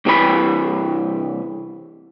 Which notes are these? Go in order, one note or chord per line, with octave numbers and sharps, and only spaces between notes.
C2 C3 E3 G#4 B5